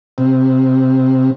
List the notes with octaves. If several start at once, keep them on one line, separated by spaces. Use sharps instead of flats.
C3